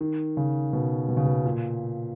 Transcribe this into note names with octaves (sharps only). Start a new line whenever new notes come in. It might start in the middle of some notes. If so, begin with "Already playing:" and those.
D#3
C#3
B2
B2
C#3
B2
A#2